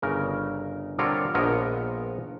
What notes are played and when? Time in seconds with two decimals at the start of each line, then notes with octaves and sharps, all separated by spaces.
0.02 G1 C#3 A#4
0.99 D3 G3 C4 F4 A#4 C#5
1.34 A#1 F3 B3 A#4 C#5 D#5